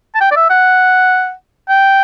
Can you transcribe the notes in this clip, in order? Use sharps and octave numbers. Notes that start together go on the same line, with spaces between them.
A5
G5
D5
E5
F#5
G5